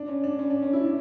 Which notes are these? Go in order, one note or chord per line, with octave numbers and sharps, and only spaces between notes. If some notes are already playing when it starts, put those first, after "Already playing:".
Already playing: D4
C#4
D4
C#4
D4
C#4
E4
D4